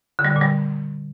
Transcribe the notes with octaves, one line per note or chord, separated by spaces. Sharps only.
D3
G3
D3
A#2
G3